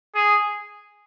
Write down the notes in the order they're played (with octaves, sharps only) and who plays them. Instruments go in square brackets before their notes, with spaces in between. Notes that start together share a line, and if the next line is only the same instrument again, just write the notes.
[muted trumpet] G#4